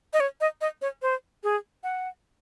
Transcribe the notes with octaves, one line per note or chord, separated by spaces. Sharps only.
D#5
C#5
D#5
D#5
C#5
C5
G#4
F#5